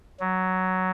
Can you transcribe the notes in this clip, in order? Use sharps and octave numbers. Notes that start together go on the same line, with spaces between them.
F#3